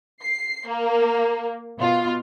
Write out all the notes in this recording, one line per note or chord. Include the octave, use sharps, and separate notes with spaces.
C7
A#3
B2 F4